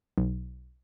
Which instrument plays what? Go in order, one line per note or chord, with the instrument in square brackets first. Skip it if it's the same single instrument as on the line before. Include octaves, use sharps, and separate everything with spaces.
[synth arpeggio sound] B1